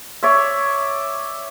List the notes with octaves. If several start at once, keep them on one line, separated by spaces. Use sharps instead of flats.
C#5 D5 E5